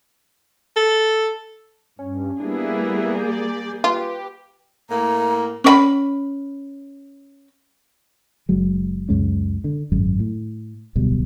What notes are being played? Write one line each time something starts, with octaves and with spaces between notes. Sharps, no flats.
A4
G2 C#4
G3 A#3 B3 D4 E4 G#4
A3
D5 G6
F4 G4 B4
A2 A#3 A#5
C#4 D5 B5
F#1 F#3 G#3
C#2 F#2 G#3 C#4
D3
G#1 F#2 G#3
A2
D1 B1 B2 G3